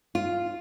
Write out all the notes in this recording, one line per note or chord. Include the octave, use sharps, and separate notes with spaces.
F4